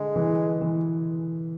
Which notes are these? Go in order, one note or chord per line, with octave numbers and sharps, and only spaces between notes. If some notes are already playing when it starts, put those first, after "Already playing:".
Already playing: D3 G#3
E3
E3